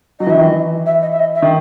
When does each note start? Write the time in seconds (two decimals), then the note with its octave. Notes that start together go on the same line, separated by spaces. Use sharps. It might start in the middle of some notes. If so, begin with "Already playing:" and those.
0.20 F#3 D#5
0.27 E3
0.30 D#3 E5
0.41 E3 D#5
0.86 E5
1.02 D#5
1.12 E5
1.20 D#5
1.35 E5
1.42 D#3